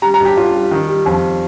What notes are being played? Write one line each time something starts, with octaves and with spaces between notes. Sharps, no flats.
G3 A#5
A#5
G2
G4
G2 F4
G3
D#3
G3
F2